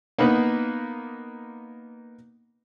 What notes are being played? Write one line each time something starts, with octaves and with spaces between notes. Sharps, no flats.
A#3 B3 D#4 B4